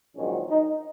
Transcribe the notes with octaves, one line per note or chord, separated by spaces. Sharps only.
A#1 G#2 D#3 F#3 C#4
D#4